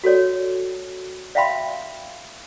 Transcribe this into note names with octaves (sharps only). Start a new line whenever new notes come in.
F#4 A4 C#5 D5
D5 E5 F5 G5 B5 C6